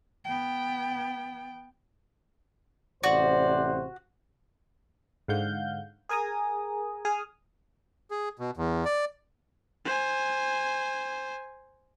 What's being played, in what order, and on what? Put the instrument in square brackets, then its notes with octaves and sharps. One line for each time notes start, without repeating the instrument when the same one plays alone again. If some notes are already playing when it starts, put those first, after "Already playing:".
[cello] B3 G5
[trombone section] A1 C3 C5 [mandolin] F#4 [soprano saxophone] D5
[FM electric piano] G#2 D3 F5 F#5 G6
G#4 A#4 G#5 A#5 D#6
G#4 D#6 F6
[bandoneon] G#4
B2
E2
D5
[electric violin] C5 G#5